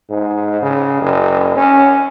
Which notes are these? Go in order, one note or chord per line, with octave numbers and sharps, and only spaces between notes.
G#2
C#3
F#1
C#4